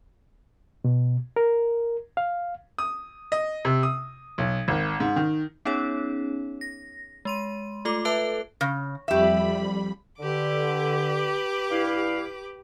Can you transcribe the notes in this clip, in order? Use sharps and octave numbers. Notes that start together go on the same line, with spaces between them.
B2
A#4
F5
D#6
D#5
C3
D#6
B1
G#1
G#2
D#3
B3 C#4 D#4 G#4 C#5
A#6
G#3 C6 D#7
A3 F4 A4 D6
A4 B4 E5 A5 F#6
C#3
F2 G3 G4 E5 B5
D3 G4 B4 D6
G2 E4 F5